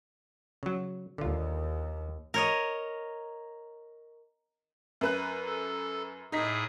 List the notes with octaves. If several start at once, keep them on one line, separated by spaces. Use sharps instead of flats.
C#3 F#3
D#2 D3 F4
A#4 C#5 D#5
F#2 B4 F#6
A4
A2 D#4 G#4 D#5 B6